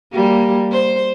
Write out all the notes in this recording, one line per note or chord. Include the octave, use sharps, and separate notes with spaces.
G3 A#3
C5